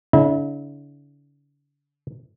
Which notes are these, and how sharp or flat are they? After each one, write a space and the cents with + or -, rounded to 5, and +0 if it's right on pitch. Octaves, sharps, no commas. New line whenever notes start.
D3 -45 E4 -40